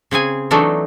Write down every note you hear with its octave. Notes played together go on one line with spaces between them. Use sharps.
C#3 C4 G#4 G#5
E3 F#3 A3 D4 D#4 A4